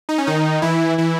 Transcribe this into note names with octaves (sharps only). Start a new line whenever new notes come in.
D#4
C#4
D#3 D#4
E3 E4
E3 E4